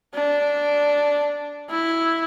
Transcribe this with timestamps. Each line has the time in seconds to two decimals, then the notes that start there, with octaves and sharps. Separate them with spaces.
0.14 D4
1.70 E4